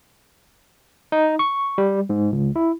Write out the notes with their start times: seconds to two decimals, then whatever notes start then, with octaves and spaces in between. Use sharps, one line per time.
1.12 D#4
1.39 C#6
1.78 G3
2.09 G#2
2.32 C#2
2.56 E4